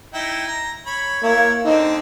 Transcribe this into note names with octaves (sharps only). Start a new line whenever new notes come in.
D#4 E4 G5
A#5
C#5 B5
A#3 E4 C#5
D3 C4 D#4